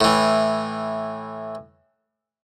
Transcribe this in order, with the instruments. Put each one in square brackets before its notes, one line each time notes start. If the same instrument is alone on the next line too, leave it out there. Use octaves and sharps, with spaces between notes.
[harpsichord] A2 E3